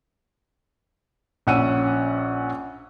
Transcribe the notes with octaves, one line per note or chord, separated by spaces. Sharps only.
A#1 C#4 F#5 E6 D#7